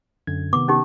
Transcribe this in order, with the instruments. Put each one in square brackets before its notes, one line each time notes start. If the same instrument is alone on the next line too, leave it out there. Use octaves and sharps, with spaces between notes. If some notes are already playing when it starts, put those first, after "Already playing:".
[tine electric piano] F#2 D3 G#6
[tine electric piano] C3 D#3 B3 [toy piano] D6
[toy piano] C#4 D#4 G4